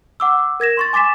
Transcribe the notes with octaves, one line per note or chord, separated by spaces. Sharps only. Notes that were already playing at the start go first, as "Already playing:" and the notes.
F#5 D6 E6
A#4 G#6 A#6 E7
C6 C#6 A6
G#5 D6 A6 B6 E7